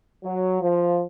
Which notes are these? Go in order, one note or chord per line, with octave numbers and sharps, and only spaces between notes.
F#3
F3